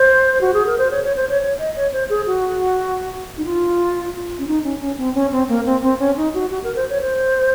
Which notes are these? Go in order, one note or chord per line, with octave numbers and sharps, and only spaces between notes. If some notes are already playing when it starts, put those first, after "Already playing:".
Already playing: C5
F#4
G#4
A#4
C5
C#5
C#5
C5
C#5
C#5
D#5
C#5
C5
G#4
F#4
D#4
F4
C#4
D#4
C#4
C#4
C4
C#4
C4
A#3
C4
C4
C#4
D#4
F#4
F#4
A#4
C5
C#5
C5